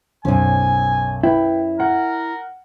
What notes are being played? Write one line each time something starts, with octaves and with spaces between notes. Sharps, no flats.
B1 F#2 C#4 C5 G#5
E4 B4 G5
A#4 F#5